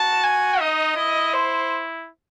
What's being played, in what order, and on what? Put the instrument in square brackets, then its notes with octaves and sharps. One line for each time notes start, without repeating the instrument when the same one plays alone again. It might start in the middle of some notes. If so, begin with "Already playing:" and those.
Already playing: [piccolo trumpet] F#4 [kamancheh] A5
[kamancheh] G#5
[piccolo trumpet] D#4 [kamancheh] D#5
[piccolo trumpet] E4 [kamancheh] D#5
[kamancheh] C5